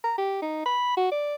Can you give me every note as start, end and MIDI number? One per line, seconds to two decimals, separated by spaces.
0.04 0.13 82
0.18 0.39 67
0.42 0.65 63
0.66 0.93 83
0.97 1.08 66
1.11 1.35 74